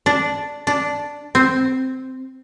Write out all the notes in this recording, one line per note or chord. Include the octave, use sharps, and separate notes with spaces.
D4
D4
C4